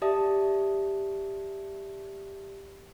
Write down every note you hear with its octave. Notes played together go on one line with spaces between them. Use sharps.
G4 D5 E5 A5 D#6